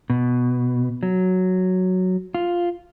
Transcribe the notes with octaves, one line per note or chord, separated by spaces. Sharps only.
B2
F#3
F4